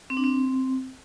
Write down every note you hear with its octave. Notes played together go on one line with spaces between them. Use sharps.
C4
D4
C4